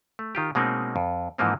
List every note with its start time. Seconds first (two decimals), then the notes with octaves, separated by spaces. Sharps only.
0.19 A3
0.35 D#3 F4 G4
0.55 B2 G#3 A#3 C4 C#4 D#4
0.96 F2
1.38 G#2 E3 F3 A#3 C4